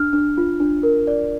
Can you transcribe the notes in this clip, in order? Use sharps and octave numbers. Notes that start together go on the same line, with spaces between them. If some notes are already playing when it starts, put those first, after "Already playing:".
Already playing: D4 F6
D4
F4
D4
A#4
D5